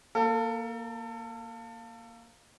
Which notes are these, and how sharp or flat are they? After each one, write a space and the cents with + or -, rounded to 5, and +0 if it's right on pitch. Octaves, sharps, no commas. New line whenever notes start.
A#3 +0 A4 +30